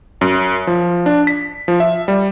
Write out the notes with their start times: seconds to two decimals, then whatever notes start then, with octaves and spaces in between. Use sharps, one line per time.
0.21 F#2
0.67 F3
1.06 D4
1.27 B6
1.68 F3
1.80 E5
2.08 G3